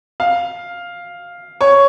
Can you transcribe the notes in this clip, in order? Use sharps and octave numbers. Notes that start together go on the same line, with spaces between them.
F5
C#5